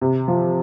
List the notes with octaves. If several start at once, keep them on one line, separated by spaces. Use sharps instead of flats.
C3
F3